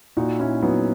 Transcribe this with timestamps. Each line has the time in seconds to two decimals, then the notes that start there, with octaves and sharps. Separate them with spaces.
0.17 A#2 D#4 F#4
0.40 A#2 C#4 E4
0.62 F#3 B3 D#4